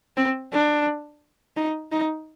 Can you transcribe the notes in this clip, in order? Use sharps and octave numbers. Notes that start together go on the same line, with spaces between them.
C4
D4
D#4
D#4